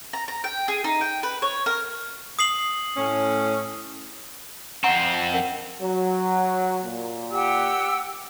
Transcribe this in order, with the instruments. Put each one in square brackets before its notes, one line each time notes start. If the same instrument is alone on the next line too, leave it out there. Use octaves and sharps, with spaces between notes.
[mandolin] A#5
A#5
G5
G#4
D#4
G5
B4
C#5
A#4
[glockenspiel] D#6 C7 F#7
[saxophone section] A2 C#4
[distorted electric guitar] F2 C4 [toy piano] F#5 A#5 C#6
[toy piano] C#4 A#4 F#5
[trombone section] F#3
A#2
[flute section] G4 F#5 E6